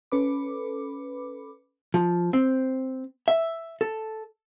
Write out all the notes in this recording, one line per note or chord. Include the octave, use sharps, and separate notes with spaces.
C#4 A4 B4 B5 D6
F3
C4
E5
A4